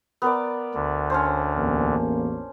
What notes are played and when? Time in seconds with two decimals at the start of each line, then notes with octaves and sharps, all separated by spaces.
0.22 B3 A#4 D5
0.75 D2 D3
1.10 C#4 D4 C5
1.56 A1 E2 A#3